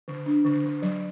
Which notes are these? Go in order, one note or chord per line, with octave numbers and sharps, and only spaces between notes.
D3
D4
D3
D3
F#3